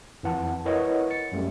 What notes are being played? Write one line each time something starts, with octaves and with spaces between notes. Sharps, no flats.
F2 E3 F#5 A5
E4 A#4 B4 C#5 D#5 F#5
A6 C#7
F#2 G3 A3